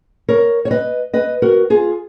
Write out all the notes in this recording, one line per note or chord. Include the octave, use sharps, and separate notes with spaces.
A#4 C#5
C#5
B4 D#5
B4 D#5
F#4 A#4
F4 G#4